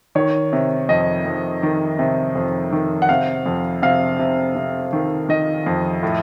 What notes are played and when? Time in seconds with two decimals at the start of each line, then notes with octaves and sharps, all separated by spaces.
0.15 D#3 C#5
0.53 C3
0.89 F2 D#5
1.25 F2
1.63 D#3
1.99 C3
2.35 F2
2.72 D#3
3.02 F#5
3.09 C3 F5
3.46 F2
3.82 C3 F5
4.19 C3
4.55 C3
4.93 D#3
5.29 D#3 D#5
5.66 F2
6.03 A2